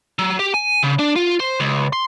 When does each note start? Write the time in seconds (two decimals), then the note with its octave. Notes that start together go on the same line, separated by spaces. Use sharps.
0.19 F#3
0.39 G4
0.54 G#5
0.83 C#3
0.99 D4
1.16 F4
1.40 C5
1.60 C#2
1.93 C6